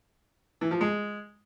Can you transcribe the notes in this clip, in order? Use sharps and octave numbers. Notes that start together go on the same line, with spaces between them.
E3
F3
G#3